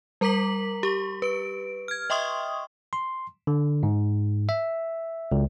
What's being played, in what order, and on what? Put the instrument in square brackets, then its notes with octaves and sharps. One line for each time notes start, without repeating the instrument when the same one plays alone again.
[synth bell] G3 A#4 A#5 D6 B6 F#7
G4 C#6
B4 D7
F6 G#6
D#5 E5 G5 C6 C#6 D#6
[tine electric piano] C6
D3
G#2
E5
C#2